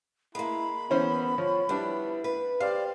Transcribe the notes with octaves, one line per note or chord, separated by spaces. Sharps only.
G#3 A#3 E4 B5
E3 B3 C#4 C5
F3 C#5
G3 B3 D4 E4
B4
G4 C5 D5 F5